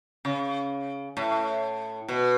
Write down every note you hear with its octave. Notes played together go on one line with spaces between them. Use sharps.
C#3
A2
B2